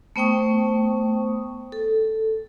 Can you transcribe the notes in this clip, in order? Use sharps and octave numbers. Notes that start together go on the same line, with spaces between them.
A3 B3 C5 G5 C#6 D#6
A4